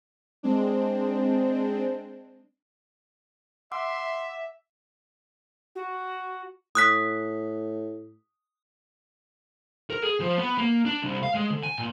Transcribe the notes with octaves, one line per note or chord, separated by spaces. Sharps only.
G#3 C4 D4
E5 F#5 C6 D6 E6
F#4
A2 D#6 F#6 B6
A#4
G#4
F3
B3
A#3
D4
C2
F5
G#3
D3
G#5
A#2